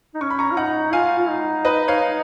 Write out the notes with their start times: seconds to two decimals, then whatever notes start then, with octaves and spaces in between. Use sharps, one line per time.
0.14 D#4
0.21 C#4 C#6
0.30 B5
0.39 A#5 C#6
0.52 F4
0.57 D#4 F#5 A#5
0.93 F4 F5 G#5
1.18 F4
1.29 D#4
1.65 B4 D#5
1.88 C#5 F5